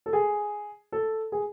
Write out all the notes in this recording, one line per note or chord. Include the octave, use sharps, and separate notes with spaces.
A4
G#4
A4
G#4